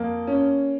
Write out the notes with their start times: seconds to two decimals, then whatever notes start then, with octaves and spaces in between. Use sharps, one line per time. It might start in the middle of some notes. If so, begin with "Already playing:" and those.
Already playing: F2 A#3
0.27 C#4